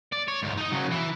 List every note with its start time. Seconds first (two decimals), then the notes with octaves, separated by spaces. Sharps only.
0.13 D5
0.28 C#5
0.43 D2 G#2
0.57 D#4 D#5
0.72 C#3 F#3
0.91 E3 E4